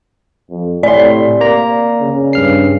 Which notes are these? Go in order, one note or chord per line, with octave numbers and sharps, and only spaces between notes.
F2
A2 C3 D5 C6
A#3 A#5
C#3
G2 F6 C7